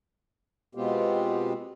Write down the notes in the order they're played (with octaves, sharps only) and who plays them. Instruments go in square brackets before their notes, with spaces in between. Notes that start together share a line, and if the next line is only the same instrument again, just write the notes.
[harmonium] B2 G#3 B3 C4 F4 G4